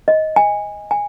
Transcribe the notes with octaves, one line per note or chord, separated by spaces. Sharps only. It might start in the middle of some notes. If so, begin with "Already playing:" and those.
D#5
G#5
G#5